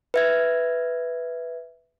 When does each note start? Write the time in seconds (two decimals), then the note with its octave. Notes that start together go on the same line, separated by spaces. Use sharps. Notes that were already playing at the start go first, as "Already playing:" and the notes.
0.14 B4 E5 G#6